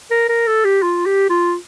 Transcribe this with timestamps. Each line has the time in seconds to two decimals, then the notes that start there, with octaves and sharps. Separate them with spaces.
0.11 A#4
0.29 A#4
0.47 A4
0.65 G4
0.83 F4
1.06 G4
1.30 F4